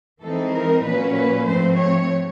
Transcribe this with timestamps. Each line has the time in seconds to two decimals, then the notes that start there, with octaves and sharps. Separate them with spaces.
0.23 E3 G#3 C4 D#4 A4
0.54 A#4
0.86 A#2 F#3 A#3 C#4 B4
1.17 B4
1.48 G#2 F3 A3 C4 C5
1.80 C#5